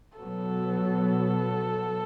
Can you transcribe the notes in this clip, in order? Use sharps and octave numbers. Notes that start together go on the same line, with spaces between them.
B2 F#3 B3 A4